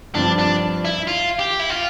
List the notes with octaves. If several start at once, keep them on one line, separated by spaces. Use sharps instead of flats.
G2 F3 C4 D4
D4
E4
F4
G4
E4
F4